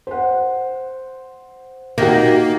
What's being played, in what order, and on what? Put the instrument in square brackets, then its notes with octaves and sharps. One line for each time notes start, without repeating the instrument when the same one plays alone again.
[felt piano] C5 F#5
[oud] D#3 [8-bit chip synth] A#3 [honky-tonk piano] F#4 A#6 [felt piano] G4 D#5 G5